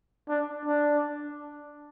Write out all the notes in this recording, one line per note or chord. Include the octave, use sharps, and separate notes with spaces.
D4
D4